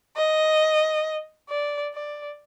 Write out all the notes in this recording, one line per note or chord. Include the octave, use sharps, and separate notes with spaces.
D#5
D5
D5